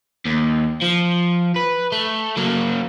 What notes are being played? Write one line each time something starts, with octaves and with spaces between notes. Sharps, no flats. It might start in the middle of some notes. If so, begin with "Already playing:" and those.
D#2
F3
B4
A3
F#3 A#3